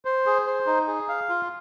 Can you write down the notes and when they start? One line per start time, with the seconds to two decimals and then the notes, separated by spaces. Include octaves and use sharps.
0.05 C5
0.26 G#4
0.46 C5
0.67 D#4
0.87 G#4
1.09 F5
1.29 F4